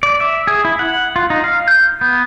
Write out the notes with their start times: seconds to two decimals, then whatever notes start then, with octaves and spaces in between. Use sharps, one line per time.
0.03 D5
0.20 E5
0.47 G#4
0.65 E4
0.79 F#5
1.16 F4
1.30 D#4
1.44 F5
1.68 G6
2.01 B3